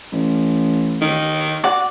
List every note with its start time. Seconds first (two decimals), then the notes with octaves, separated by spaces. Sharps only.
0.13 A1
1.02 D#3
1.64 F#4 D5